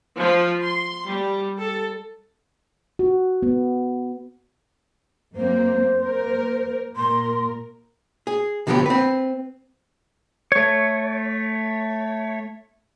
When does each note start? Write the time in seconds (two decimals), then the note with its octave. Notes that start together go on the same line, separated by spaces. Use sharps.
0.18 F3
0.63 C6
1.08 G3
1.59 A4
2.99 F#4
3.43 B3
5.35 F#2 A#3 C4 C5
6.03 A#3 A#4
6.96 A#2 A#4 C6
8.27 G#4
8.67 B1 D3 F3 F#3 B3 G4
8.86 C4 B4
10.52 A3 C#5